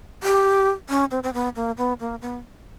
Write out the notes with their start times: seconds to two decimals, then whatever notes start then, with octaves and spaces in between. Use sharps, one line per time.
0.23 G4
0.89 C#4
1.11 C4
1.23 C4
1.33 B3
1.56 A#3
1.77 B3
2.00 A#3
2.22 B3